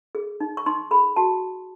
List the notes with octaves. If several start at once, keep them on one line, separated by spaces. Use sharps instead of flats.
G#4
D#4
C#6
D#4 C6
G#4 B5
F#4 A5